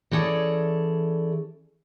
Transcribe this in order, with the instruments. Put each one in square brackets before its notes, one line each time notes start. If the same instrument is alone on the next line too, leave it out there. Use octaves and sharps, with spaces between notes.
[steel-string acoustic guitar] E3 C#4 G#4 A4 D5